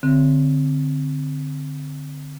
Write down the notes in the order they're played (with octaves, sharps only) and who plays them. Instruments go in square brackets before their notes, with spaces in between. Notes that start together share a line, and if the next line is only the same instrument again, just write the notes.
[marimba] D3 C4